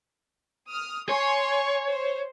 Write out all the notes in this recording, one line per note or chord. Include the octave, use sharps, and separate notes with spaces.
D#6 F6
C#5 G#5 C6 C#6
C5